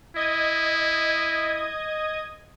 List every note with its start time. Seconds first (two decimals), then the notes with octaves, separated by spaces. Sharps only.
0.16 E4 D#5 D#6 G#6